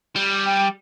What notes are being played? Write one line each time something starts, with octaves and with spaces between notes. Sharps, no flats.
G3
G5